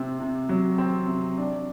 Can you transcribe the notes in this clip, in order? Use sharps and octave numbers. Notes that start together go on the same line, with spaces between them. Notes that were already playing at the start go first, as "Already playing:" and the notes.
Already playing: C3 C4
C3
F#3
C4
C3
D4